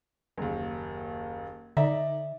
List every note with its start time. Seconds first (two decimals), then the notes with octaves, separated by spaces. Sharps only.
0.38 F#1 D#2
1.77 D3 D#4 D5 E5 A#5